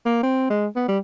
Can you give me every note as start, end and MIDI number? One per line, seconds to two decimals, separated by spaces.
0.05 0.18 58
0.23 0.46 60
0.50 0.66 56
0.76 0.86 59
0.88 0.98 55